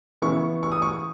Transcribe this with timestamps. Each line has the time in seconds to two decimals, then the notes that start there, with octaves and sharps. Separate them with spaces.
0.22 C#3 E3 B3 E4 C#6
0.63 C#6
0.72 D#6
0.82 C#6